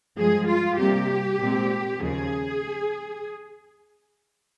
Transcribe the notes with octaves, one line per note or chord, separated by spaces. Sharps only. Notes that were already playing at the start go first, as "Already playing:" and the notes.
G2 F3 G#3 G#4
F4
C3 G3 A#3 G4
A#2 G#3 C4
D#2 C#3 F3 G#4